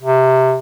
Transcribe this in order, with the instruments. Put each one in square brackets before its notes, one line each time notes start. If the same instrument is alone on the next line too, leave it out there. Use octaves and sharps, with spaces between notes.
[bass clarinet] C3